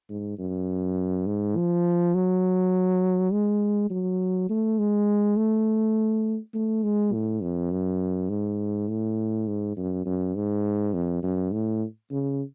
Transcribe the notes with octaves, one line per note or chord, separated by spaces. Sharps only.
G#2
F#2
G#2
F3
F#3
G#3
F#3
A3
G#3
A3
A3
G#3
A2
F2
F#2
G#2
A2
G#2
F#2
F#2
G#2
F2
F#2
A2
C#3